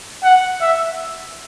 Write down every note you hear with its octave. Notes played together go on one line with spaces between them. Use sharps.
F#5
E5